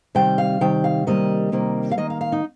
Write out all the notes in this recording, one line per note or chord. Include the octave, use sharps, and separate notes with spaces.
C3 D#3 G3 G5
F5
C3 D#3 G3 G5
F5
C3 D#3 G3 A#3 D#5
C3 D#3 G3 A#3
F5
D#3 A#3 D#5
F5
F5
D#4